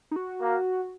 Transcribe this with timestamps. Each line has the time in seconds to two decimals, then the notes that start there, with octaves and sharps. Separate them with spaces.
0.11 D#4
0.16 F#4
0.40 A#3